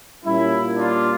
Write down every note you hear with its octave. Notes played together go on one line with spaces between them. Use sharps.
A#2 G3 A#3 C#4 E4
D4 F4